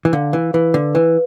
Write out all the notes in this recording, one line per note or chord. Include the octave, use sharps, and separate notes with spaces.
E3
D3 F5
E3
E3 B4
D3
E3 B4